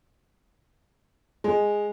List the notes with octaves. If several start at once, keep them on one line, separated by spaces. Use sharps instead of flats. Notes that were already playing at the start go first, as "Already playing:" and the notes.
G#3